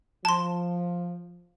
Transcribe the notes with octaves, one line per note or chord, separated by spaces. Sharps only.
F3 A5 C6